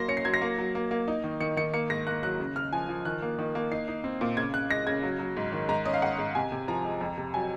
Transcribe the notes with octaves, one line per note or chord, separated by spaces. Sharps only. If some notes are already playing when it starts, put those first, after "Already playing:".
Already playing: F#3 A#3 C6 A#6
C#4 C#7
C7
F#3 G#6
A#6
A#3
F#3
A#3
A#3
D#4
D#3
D#3 C#7
D#3 C#7
A#3 C#7
G#2 A#6
A#3 F#6
F#3 F#6
C#3
C#3 F6
F3 G#5
F3
D#3 F#6
A#3
D#3
A#3
D#4 C7
D#4
C4
A#2
C#3 G#6
C#3 F#6
G#3 A#6
C#3 G#6
F#3
F#3
G#2
D#3
G#2 A#5
C#4 D#5
F5
G#2 F#5
G#2
C3 G#5
C3
F3 A#5
G#3
F2
C3
F#3 G#5